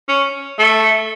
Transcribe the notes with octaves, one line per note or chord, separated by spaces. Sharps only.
C#4
A3